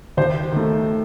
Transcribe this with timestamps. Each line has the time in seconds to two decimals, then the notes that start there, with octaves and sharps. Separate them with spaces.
0.17 D#2 C5
0.52 D#3 A3